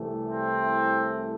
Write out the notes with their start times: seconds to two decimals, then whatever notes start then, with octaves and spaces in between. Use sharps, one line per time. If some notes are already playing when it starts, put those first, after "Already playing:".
Already playing: C2 C3 E3 A3
0.28 C4